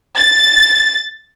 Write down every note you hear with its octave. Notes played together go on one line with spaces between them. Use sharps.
A6